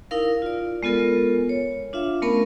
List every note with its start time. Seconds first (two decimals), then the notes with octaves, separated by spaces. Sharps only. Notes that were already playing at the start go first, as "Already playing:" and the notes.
0.11 D#4 E4 A#4 F5
0.42 F4 D5
0.83 G#3 B3 F4 A4 A#4
1.49 C#5
1.93 D4 F4 E5 F5
2.22 A3 B3 C#4 A#4 B5